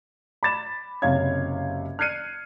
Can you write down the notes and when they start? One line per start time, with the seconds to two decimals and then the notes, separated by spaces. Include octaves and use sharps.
0.43 B5 D6 A6 E7
1.02 F#1 C3 C#4 C#5 F5 G#6
1.99 F6 F#6 G#6 C7 C#7 D#7